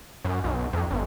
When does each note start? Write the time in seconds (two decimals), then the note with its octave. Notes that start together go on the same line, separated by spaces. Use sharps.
0.25 F#2
0.44 B1
0.73 F2
0.91 G1